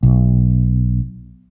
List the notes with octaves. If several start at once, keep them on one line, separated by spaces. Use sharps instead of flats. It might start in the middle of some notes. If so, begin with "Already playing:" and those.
B1